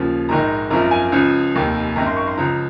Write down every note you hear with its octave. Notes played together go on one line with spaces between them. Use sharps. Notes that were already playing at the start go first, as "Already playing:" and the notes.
Already playing: D#2 C#3 F3
A#1 G#2 D#3 A#5
G#1 F#2 F3 A#5
G#5
C#2 C#3 F3
F1 D#2 D#3
G#1 F#2 D#3 A#5
C6
C#6
C6
C#2 C#3 F3 A#5